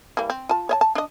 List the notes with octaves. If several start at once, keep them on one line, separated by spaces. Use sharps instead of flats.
E3 G3 A#3
C4
F4 A5
C#5 D#5 A5
A5
D4 D#5